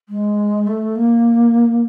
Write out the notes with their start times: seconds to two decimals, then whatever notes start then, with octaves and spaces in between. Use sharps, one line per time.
0.09 G#3
0.67 A3
0.95 A#3